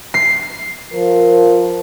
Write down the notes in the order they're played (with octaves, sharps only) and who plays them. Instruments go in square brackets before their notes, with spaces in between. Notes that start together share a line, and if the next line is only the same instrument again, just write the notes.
[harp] C7
[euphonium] F3 [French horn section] A#4